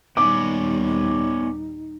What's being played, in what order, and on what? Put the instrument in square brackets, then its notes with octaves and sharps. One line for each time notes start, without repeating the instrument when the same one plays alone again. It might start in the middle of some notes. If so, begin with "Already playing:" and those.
[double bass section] D#2 A#2 G3 [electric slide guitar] B3 C#4 D5 [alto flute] D#4 [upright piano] D6